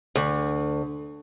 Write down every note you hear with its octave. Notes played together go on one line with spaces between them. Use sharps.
D2